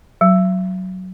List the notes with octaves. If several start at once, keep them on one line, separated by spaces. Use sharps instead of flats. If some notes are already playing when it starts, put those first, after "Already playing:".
F#3